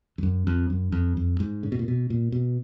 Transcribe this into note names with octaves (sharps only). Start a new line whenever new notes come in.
F2
F#2
F2
F#2
F2
F2
G#2
C#3
B2
A#2
B2
A#2
B2